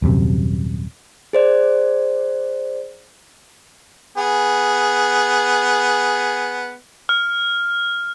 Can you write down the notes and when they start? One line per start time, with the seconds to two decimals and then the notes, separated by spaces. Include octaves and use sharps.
0.02 D#1 F#2 C3
1.33 G#4 C5 D5
4.17 B3 G#4
7.09 F6